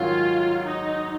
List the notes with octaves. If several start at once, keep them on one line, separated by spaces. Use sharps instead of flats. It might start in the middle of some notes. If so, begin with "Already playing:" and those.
Already playing: G#2 D#3 F#3 C#4 F4
D#4